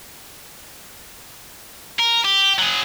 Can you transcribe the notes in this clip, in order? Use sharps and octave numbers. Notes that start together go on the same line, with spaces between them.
A#4
G4
F#3 G#4